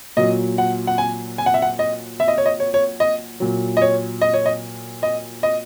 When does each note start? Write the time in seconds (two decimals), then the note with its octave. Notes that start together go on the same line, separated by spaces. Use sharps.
0.17 A#2 F#3 D#5
0.58 F#5
0.87 F#5
0.98 G#5
1.38 G#5
1.46 F#5
1.54 E5
1.62 F#5
1.79 D#5
2.20 E5
2.28 D#5
2.38 C#5
2.46 D#5
2.60 C#5
2.74 C#5
3.00 D#5
3.40 A#2 F#3
3.77 D#5
3.82 C#5
4.21 D#5
4.34 C#5
4.46 D#5
5.03 D#5
5.43 D#5